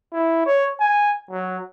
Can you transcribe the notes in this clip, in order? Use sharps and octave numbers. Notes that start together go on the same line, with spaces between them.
E4
C#5
G#5
F#3